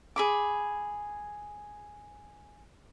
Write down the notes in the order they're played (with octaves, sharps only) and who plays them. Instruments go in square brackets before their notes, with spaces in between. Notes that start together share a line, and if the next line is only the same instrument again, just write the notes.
[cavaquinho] G#4 B5 D6